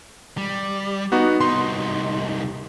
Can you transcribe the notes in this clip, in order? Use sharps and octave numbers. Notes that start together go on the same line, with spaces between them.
G3
B3 D#4 F#4
C2 D#4 C6